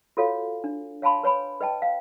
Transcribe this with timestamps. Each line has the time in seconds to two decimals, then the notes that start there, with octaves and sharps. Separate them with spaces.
0.17 F4 F#4 A4 C#5 F5
0.64 D4
1.02 C#5 F5 G#5 A5 B5 C6
1.24 B4 C#5 G#5 B5
1.61 B4 D#5 G5 A5
1.82 F5